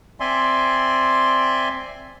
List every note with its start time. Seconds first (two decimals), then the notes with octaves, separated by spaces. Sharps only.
0.20 C4 D5 E5 G#5 C6